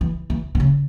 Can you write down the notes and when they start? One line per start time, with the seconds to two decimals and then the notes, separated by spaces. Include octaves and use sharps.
0.01 E3
0.30 E3
0.55 D3
0.60 C#3